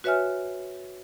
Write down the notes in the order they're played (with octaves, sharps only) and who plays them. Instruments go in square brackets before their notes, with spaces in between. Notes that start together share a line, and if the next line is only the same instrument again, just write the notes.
[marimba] F#4 B4 C#5 E5 G#5 F6